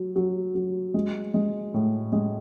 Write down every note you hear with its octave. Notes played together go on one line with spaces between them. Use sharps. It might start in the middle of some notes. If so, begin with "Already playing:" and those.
Already playing: F#3
F#3
F#3
G#3
G#3
A2
G#3